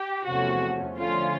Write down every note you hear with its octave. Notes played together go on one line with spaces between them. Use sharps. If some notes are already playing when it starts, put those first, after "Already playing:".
Already playing: G4
E2 C3 F3 A3 C#4 F#4
D3 F3 A3 C#4 F4